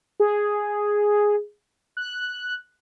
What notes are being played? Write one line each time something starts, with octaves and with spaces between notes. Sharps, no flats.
G#4
F#6